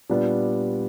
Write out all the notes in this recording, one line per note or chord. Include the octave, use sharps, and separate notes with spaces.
A#2 G3 B3 D4